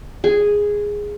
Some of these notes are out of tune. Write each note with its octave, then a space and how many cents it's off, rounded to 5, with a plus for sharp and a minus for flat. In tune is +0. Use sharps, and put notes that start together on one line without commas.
G#4 -5